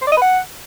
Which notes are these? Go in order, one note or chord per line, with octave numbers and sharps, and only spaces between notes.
C5
D5
D#5
B4
F#5